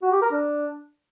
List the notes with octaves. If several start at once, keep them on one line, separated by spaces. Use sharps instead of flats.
F#4
G4
A#4
D4